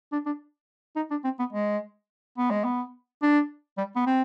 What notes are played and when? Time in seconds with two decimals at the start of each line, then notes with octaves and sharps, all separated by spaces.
0.12 D4
0.26 D4
0.96 D#4
1.10 D4
1.24 C4
1.39 B3
1.52 G#3
2.38 B3
2.50 G#3
2.64 B3
3.22 D4
3.78 G3
3.96 B3
4.06 C4